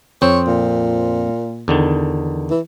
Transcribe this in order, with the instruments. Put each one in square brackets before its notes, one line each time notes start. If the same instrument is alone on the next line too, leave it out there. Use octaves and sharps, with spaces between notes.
[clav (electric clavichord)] F2 C4 C5 [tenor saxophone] C#5
[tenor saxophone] A#2
[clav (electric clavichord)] E2 D3 D#3
[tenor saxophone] E3